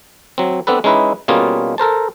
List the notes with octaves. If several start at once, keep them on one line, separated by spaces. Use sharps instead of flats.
F#3 C4
B3 C4 D4 A4 B4
G#3 C#4 D#4 E4 B4
B2 G3 A#3 C#4 F4 G#4
A4 A#4 C5 A5